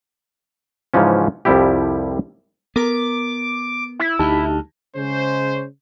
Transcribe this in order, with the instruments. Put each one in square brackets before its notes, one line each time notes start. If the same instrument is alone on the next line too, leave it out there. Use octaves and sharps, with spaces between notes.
[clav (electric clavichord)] G#2 C#3 E3 F3 C#4
C2 F2 F3 G3 E4 G4
[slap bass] B3 [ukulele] A#4 [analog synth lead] D6
[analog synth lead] E4
[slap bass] D2 [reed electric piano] D#4 G4 A5
[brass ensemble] C#3 G#3 C#4 C5